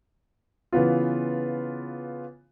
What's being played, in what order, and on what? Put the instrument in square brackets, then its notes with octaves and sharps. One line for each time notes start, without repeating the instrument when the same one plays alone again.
[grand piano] C#3 E3 B3 F4